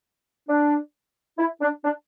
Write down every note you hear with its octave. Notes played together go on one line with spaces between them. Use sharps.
D4
E4
D4
D4